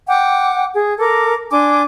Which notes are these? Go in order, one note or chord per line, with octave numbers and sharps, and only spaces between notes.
F#5 G5 D6
G#4
A4 A#4 D6
D4 G#5 C6 D6